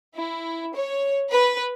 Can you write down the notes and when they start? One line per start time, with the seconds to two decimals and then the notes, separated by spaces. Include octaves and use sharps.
0.15 E4
0.74 C#5
1.30 B4